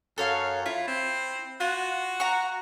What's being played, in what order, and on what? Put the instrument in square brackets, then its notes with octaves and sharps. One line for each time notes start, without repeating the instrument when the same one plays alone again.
[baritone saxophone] F#2 [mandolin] A4 C#5 F5
[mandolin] E4 [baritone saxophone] F4
[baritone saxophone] C4
[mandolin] F4 [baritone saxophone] F#4
[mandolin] F#5 A#5 C#6